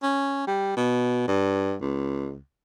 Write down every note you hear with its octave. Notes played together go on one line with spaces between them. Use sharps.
C#4
G3
B2
G2
C#2